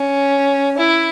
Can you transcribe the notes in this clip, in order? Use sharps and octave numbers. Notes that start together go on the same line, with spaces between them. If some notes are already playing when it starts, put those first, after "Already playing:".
Already playing: C#4
E4